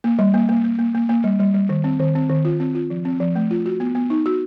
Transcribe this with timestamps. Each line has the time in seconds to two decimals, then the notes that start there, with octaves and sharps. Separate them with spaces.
0.04 A#3
0.19 G3
0.34 A#3
0.49 A#3
0.64 A#3
0.79 A#3
0.95 A#3
1.09 A#3
1.24 G3
1.40 G3
1.55 G3
1.69 D#3
1.84 C4
2.00 D#3
2.15 C4
2.29 D#3
2.45 F4
2.60 C4
2.75 F4
2.90 F3
3.05 C4
3.20 F3
3.36 A3
3.51 F4
3.66 F#4
3.80 B3
3.95 B3
4.10 D#4
4.26 F#4